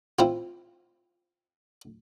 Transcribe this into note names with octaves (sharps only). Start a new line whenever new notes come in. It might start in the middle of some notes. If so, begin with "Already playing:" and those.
C4 E4 F4